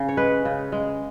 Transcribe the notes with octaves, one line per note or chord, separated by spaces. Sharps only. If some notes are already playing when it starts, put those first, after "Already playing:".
Already playing: C#3
C#5
G#3 B4
C#3
G#3